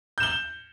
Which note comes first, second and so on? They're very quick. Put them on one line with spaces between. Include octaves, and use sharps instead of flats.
G6 E7 G7